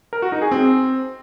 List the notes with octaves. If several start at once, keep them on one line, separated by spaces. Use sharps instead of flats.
A#4
F#4
D#4
G#4
C4